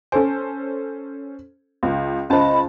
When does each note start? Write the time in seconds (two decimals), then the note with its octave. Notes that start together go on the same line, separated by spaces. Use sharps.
0.12 C#4 A4 C5 G#5
1.83 C#2
2.30 C#2 C#4 C5 D#5 A5 B5